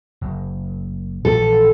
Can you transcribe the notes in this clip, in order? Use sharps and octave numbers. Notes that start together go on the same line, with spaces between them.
F#1
A#1 E3 A4